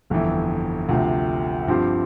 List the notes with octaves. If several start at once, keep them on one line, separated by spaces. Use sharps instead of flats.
G1 F2 E3
D2 C3 F3
G2 F3 C4 G4